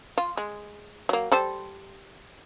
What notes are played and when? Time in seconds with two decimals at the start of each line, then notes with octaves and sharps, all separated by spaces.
0.18 F4
0.37 G#3
1.09 F#3 A#3
1.32 G3 A4 C5